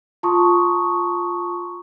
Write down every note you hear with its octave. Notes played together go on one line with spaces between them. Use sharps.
F4 A5 A#5 C6 C#6 D#6